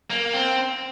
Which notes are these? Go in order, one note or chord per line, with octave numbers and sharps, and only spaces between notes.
A#3
C4